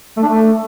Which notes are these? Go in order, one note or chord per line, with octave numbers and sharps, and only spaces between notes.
A3
D4
A3